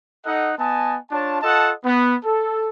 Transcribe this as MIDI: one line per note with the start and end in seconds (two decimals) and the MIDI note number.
0.24 0.52 63
0.24 0.52 69
0.24 0.52 75
0.24 0.52 78
0.59 0.96 59
0.59 0.96 75
0.59 0.96 80
0.59 0.96 81
1.11 1.37 62
1.11 1.37 65
1.11 1.37 73
1.11 1.37 81
1.42 1.72 65
1.42 1.72 69
1.42 1.72 75
1.42 1.72 78
1.42 1.72 81
1.84 2.15 59
2.23 2.69 69